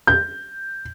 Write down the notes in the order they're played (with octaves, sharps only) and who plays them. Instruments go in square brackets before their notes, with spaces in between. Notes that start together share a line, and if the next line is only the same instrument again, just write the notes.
[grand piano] G6